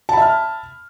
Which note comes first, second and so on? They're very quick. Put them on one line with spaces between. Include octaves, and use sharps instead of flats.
A5 B5 E5 F6